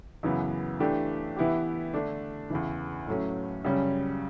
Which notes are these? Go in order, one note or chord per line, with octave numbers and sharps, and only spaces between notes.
F#2 C#3 E3 B3
E3 A3 D4 G4
E3 B3 E4 G4
D3 A3 D4
E2 C#3 E3
A2 F#3 A3 C#4
F#2 C#3 G3 C#4